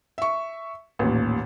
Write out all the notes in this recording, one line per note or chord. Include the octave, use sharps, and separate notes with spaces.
E5 C#6
A1 D#2 A#2